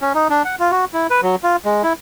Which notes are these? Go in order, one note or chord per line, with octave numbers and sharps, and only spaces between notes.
C#4
D#4
D4
F#5
F4
F#4
E4
B4
F#3
F4
G#3
E4